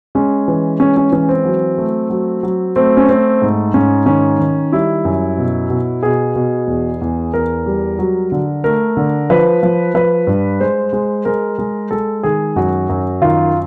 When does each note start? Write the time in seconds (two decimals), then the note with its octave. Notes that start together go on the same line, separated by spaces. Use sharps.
0.15 G#3 C#4
0.48 E3
0.80 G#3 C#4
0.97 C#4
1.12 E3 C#4
1.29 C4
1.45 F#3
1.78 A3
2.10 F#3
2.43 F#3
2.76 A3 C4
2.97 C#4
3.09 A3 C4
3.42 G#2
3.74 G#2 C#4
4.06 D#3 C#4
4.40 D#3
4.72 G3 E4
5.05 F#2
5.38 B2
5.70 B2
6.03 B2 G#4
6.35 B2
6.67 E2
7.01 E2
7.34 E2 A#4
7.66 G3
7.99 F#3
8.32 D3
8.64 A3 A#4
8.97 D3
9.30 F3 B4
9.63 F3
9.94 F3 B4
10.27 G2
10.60 G#3 C5
10.93 G#3
11.25 G#3 A#4
11.58 G#3
11.91 G#3 A4
12.23 D#3 G#4
12.56 F#2 F#4
12.89 F#2
13.22 D#3 F4